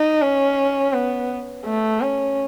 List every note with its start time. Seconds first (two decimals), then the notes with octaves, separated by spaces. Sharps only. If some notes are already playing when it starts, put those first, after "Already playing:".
Already playing: D#4
0.22 C#4
0.93 B3
1.66 A3
2.01 C#4